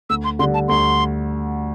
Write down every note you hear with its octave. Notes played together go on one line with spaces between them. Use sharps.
D2 E6
C6
D3 G3 C6
A5
D2 C6